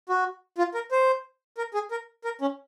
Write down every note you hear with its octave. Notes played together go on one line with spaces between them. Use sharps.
F#4
F4
A#4
C5
A#4
G#4
A#4
A#4
C#4